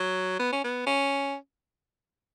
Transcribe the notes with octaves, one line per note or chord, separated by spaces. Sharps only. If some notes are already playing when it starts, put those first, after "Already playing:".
Already playing: F#3
B3
C#4
B3
C#4